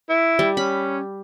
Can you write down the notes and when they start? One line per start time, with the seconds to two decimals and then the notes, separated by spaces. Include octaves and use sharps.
0.09 E4
0.39 G3
0.57 C#4 B5